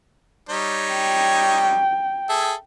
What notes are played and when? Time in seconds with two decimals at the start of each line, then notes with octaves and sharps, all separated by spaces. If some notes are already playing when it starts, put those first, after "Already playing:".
0.49 G3 D#4 C#5
0.91 G5
2.29 G#4 A4 E5